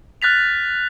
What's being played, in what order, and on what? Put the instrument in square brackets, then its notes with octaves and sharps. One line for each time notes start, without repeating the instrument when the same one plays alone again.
[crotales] F6 F#6 A6 B6 F7